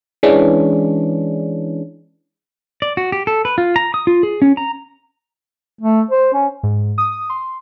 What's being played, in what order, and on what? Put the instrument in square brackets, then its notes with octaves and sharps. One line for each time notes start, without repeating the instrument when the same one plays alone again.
[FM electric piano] E3 G#3 C#4 D4
[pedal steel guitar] D5
F#4
G4
A4
B4
F4
A#5
D#6
F4
G#4
C#4
A#5
[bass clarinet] A3
C5
C#4
[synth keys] G#2
D#6
C6